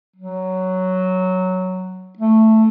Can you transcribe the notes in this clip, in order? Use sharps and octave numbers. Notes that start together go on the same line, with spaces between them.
F#3
A3